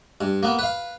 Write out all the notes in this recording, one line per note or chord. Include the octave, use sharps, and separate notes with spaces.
G2
A#3 B3
B4 F5